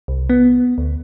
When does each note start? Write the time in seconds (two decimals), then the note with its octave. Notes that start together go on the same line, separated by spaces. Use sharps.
0.08 C2
0.30 B3
0.78 D2